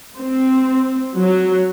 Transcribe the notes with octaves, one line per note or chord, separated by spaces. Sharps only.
C4
F#3